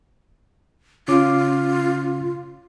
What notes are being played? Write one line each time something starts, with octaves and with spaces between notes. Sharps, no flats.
C#3 C#4 F4 D6